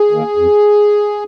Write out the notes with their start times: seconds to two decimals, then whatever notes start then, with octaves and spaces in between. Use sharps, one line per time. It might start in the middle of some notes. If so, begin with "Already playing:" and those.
Already playing: G#4
0.11 D#3 A#3
0.37 F2